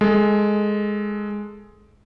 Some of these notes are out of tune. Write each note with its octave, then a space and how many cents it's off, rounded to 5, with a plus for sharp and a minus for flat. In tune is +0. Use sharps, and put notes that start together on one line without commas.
G#3 +0 A4 +0